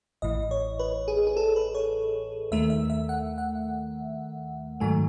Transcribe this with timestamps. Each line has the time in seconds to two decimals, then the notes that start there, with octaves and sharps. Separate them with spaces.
0.22 A1 A2 E3 D#5
0.51 C#5
0.79 B4
1.08 G#4
1.27 G#4
1.37 A4
1.56 B4
1.75 C#5
2.52 D#2 D#3 A3 E5
2.70 E5
2.90 E5
3.09 F#5
3.38 F#5
4.80 G#2 D#3 F#3 A3 G#5